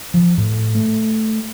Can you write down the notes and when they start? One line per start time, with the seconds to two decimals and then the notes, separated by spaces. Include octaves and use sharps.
0.14 F3
0.38 A2
0.75 A3